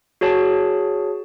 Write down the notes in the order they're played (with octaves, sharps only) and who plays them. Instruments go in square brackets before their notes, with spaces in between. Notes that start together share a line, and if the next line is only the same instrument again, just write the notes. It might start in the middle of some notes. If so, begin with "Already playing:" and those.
[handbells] F#4 G#4 C#5 A5